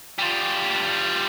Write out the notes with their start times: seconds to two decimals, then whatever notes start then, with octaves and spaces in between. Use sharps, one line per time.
0.19 G3 F4